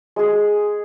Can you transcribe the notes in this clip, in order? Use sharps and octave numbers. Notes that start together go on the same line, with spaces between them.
G#3 G#4